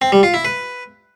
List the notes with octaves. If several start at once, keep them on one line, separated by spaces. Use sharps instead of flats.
C4
G3
F4
E4
B4